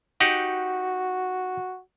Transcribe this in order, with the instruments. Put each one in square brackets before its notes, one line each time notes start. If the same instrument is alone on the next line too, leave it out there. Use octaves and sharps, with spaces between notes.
[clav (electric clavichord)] D#4 G4 F#5 [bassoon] F#4